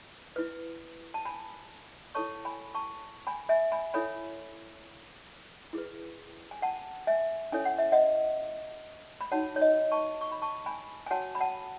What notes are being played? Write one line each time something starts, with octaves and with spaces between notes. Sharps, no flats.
E4 B4
A5
G#5 B5
E4 A4 C#5 A5 C#6
G#5 B5
A5 C#6
G#5 B5
E5 G#5
G#5 B5
E4 A4 C#5 G#5 B5
E4 G#4 B4
G#5
F#5 A5
E5 G#5
C#4 E4 A4 C#5 G#5
F#5
E5
D#5 F#5
B5
D#4 F#4 C#5 F#5 A5
C#5
D#5
A5 C#6
C#6
B5
A5 C#6
G#5 B5
G#5
F#4 C#5 F#5 A5
B5
F#5 A5